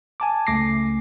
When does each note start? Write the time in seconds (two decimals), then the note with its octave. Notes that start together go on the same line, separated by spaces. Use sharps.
0.20 G#5 A5 D6
0.47 C#2 A3 D6 A#6 C7